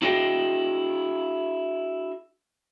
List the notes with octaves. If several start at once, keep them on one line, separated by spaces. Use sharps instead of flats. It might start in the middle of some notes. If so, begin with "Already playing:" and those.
D4 E4 F#4 G#4 D#5 G5